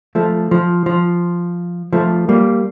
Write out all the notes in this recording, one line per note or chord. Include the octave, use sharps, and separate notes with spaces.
F3 A3
F3
F3
F3 A3
G3 A#3